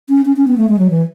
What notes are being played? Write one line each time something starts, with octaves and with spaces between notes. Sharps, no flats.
C#4
C#4
C#4
B3
A3
G#3
F#3
E3